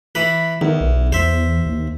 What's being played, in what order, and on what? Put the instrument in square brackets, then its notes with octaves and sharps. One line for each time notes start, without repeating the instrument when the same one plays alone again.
[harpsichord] E3 B4
[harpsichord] E2 [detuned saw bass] D#3
[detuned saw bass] B1
[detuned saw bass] E2 [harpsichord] C5 E5
[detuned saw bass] D#2